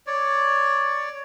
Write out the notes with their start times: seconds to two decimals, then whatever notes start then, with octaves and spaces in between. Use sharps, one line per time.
0.07 C#5 D5